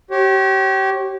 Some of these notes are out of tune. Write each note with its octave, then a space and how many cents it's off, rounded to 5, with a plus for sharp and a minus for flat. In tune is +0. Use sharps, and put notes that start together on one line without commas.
G4 -30 C#5 -30